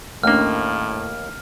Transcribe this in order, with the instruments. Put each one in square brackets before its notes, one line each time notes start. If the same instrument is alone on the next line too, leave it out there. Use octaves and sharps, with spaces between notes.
[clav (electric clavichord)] D#2 A#3 [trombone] A2 [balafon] A3 C#4 D4 [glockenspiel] F6